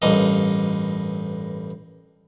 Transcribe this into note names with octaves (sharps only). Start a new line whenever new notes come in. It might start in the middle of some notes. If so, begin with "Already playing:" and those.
A1 G2 A#3 D#5